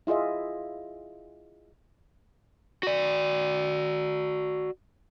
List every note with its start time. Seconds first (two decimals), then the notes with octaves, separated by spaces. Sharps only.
0.07 E4 F4 G#4 D#5 E5
2.83 F#4 D5